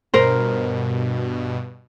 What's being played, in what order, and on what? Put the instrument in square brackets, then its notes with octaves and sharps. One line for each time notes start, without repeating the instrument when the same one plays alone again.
[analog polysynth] G2 B2 [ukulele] A#4 C5